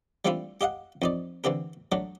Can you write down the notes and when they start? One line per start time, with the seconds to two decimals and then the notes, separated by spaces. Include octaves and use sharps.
0.25 G3 A3 C4 D4 E4 F4
0.61 G4 D#5 F5 F#5
1.02 F2 D#4 D5
1.44 D3 E3 C4 G4 A#4
1.92 F#3 A3 D4